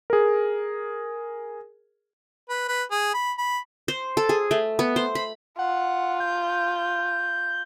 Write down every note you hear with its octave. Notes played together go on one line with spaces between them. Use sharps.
G#4 A#4
B4
B4
G#4
B5
B5
C5
A4
G#4
A3
B3
C5
B5
F4 F#5
G6